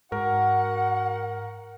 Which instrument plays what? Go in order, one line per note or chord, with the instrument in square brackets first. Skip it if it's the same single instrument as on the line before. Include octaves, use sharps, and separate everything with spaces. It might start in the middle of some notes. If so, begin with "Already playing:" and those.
[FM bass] G#2 [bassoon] F#4 [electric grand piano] A#4 [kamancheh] F#5